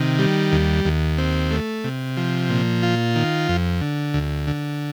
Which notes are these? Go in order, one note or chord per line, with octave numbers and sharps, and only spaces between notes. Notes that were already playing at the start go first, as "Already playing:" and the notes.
Already playing: C3 D#3
G3
D#2
D#2
C4
A3
C3
F3
A#2
F4
D#3
F2
D3
D2
D3